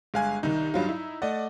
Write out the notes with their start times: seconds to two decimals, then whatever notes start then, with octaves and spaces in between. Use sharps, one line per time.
0.14 G1 G#3 F5 G#5 F#6
0.43 C2 D#3 D#4
0.74 G2 F#3 F4
0.89 E4
1.22 A3 D5 D#5 F#5